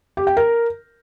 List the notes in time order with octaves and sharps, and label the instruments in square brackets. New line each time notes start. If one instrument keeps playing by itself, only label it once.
[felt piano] G4
G5
A#4